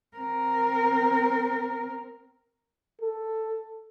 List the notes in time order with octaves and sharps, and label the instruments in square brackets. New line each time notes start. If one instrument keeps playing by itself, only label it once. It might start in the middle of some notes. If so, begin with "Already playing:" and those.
[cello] C4 A#4
[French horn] A4